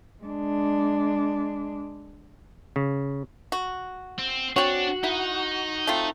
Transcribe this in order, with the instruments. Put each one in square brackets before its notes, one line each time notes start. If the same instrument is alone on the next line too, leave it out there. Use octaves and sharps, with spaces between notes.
[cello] G#3 D4
[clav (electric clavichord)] C#3
[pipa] F#4
[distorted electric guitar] C4
[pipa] C4 C#5 [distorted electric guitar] D4 [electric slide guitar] F#4
[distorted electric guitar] D#4 [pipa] E4
[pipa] A3 C4 F4